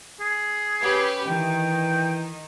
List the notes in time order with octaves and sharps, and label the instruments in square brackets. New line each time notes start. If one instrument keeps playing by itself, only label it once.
[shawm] G#4
[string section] C#4 G4 B4
[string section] D#3 [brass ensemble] E3 [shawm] G5